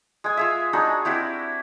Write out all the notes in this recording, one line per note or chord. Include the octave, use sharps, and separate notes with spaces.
G#3 G#5
F4 G#4 E5
G#3 D4 D#4 F#4
C4 E4 F#4 G4